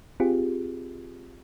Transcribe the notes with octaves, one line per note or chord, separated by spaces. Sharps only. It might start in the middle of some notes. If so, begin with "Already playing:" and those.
C4 F4 G4 G#4